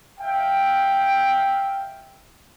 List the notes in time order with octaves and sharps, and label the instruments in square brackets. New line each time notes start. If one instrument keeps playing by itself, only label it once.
[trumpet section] E5 F5 G5